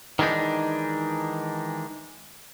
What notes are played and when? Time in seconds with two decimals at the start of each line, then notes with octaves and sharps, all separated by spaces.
0.19 D#3 E3 G#3 D4 D#4